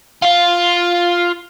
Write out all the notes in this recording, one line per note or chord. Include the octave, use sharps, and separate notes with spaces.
F4 F5